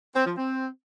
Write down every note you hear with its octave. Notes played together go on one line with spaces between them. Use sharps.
C4
F3
C4